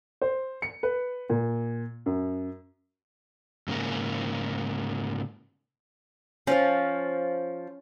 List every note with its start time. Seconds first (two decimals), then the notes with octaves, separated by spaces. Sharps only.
0.22 C5
0.62 C#7
0.83 B4
1.30 A#2
2.06 F#2
3.68 G#2 C#3 A#3
6.47 F3 C#4 F5